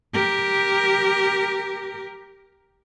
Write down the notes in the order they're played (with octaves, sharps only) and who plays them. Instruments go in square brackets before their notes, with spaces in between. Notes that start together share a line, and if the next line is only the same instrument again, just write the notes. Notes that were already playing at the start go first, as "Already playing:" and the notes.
[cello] G4 A#4